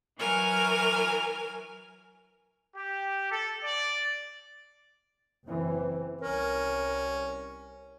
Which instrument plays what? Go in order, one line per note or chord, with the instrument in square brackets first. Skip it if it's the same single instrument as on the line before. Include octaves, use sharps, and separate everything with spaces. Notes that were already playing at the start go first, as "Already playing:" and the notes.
[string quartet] E3 F#3 A#4 G#5 F6
[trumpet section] G4
A4
D5
[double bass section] F#1 E3 C4
[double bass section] C2 [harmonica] C#4 [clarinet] A#4